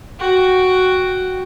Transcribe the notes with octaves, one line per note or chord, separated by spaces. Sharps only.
F#4 G5